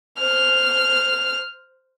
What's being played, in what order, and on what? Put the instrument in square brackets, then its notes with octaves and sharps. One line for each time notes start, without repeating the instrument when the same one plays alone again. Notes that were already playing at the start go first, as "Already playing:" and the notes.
[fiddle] C5 F6